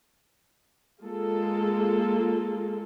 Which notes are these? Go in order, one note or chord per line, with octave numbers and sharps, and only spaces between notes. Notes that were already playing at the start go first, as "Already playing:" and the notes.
G#3 A#3 F4 A4